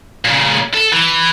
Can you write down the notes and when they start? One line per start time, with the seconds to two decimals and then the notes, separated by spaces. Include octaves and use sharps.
0.25 A#2 C#3
0.74 A4
0.93 E3